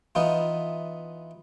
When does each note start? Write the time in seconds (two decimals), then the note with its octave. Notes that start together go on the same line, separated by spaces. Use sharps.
0.15 E3 B3 D#4 F4